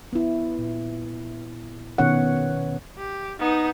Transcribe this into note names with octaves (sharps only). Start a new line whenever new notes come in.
B3 E4
A#2
B2 D#3 B3 C#4 C#5 F#5
G4
B3 D#4